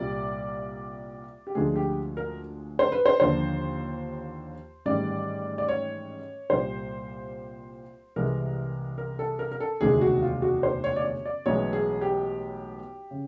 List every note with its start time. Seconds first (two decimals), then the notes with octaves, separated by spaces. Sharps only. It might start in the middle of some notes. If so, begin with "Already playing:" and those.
Already playing: C2 A#2 G3 D5
1.47 G4
1.55 D2 D3 F3 G#3 G#4
1.76 G4
2.17 A#4
2.79 C5
2.92 B4
3.06 C5
3.20 D#2 D3 F3 C5
4.85 A1 G#2 D#3 G3 D5
5.58 D5
5.68 C#5
6.50 C2 A#2 G3 C5
8.16 C2 C3 E3 G#3 A#4
8.98 A#4
9.19 A4
9.39 A#4
9.52 A#4
9.60 A4
9.81 E1 D2 C3 D#3 G#3 G#4
10.01 F#4
10.22 F4
10.42 F#4
10.63 C5
10.84 C#5
10.96 D5
11.05 C#5
11.26 D5
11.46 B1 A2 E3 G#3 C#5
11.73 G#4
12.01 G4
13.11 C#3